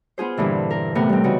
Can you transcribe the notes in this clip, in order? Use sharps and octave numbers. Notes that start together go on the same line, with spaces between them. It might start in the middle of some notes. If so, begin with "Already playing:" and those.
B3 F4 G#4 C5
G2 A#2 D3 E3
A#4
A2 C3 B3 A#4
G3 C4
C#3 B3 D#4 F#4